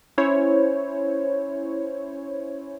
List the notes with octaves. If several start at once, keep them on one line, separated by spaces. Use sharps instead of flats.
C#4 E4 C5 C#5